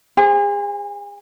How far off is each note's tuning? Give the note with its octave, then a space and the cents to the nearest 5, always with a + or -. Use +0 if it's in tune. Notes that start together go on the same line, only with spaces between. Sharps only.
G#4 -40 C5 +0 G#5 +0